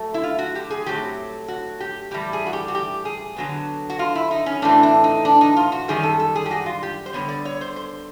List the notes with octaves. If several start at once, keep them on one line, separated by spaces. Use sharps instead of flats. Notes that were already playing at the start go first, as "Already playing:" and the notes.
Already playing: F#3 A3
E4
F4
F#4
G4
G#4
A2 F#3 A3 C4 G4
F#4
G4
A2 E3 G3 G4
G#4
F#4
G4
F#4
G4
G#4
D3 F#3 B3
F#4
F4
E4
D#4
C#4
A2 E3 A3 C4 D4
D4
D#4
D4
D#4
F4
F#4
F#2 D#3 G3 G#4
A4
A4
G#4
G4
F#4
F4
G4
C5
D3 G3 B3 C#5
D5
C#5
C5
C5